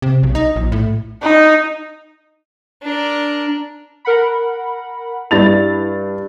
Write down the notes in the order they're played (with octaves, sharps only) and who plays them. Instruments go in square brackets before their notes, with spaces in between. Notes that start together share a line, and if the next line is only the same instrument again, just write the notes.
[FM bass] C3
B1
D#4
A#1
A2
[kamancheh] D#4
[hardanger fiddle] D4 A#4
[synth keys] A#4 F#5 B5
[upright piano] G2 A6 F7 [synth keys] E4